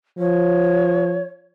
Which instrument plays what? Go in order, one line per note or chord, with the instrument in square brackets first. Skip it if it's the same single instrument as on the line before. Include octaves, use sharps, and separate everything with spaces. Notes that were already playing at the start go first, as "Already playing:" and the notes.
[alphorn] F3 [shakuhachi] C#5